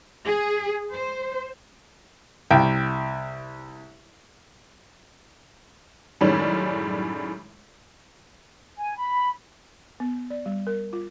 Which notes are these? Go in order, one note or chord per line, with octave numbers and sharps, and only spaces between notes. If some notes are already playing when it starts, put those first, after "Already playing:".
G#4
C5
C2 G5
F#2 A2 D#3 G3 G#3 C#4
G#5
B5
B3
D5
G3
A#4
F4